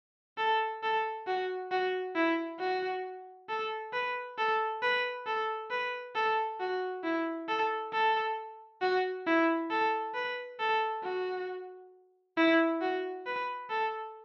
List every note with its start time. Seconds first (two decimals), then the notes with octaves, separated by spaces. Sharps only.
0.38 A4
0.83 A4
1.27 F#4
1.71 F#4
2.16 E4
2.60 F#4
3.49 A4
3.93 B4
4.38 A4
4.82 B4
5.27 A4
5.71 B4
6.15 A4
6.60 F#4
7.04 E4
7.48 A4
7.93 A4
8.82 F#4
9.26 E4
9.71 A4
10.15 B4
10.60 A4
11.03 F#4
12.37 E4
12.81 F#4
13.26 B4
13.70 A4